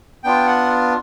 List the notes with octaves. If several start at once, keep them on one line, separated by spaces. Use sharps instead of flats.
B3 D4 F4 G5
F#5